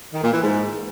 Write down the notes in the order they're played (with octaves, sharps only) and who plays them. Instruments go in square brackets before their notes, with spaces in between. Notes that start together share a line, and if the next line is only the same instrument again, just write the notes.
[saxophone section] D#3
A#2
E3
G#2